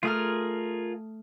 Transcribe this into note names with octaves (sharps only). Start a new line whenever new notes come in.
A3 F4 G#4 A#4 D#6 F6